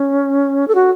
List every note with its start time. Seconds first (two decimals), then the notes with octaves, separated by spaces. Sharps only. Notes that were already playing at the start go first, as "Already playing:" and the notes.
Already playing: C#4
0.68 A4
0.75 F#4